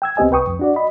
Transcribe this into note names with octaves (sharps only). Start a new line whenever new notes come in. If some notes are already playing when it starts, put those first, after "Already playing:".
G5 E6 G#6
C#2 B3 C4 G4 D#5 G#5
C2 B4 G5 C#6 D#6
F2
D4 F#4 D5
D#5 B5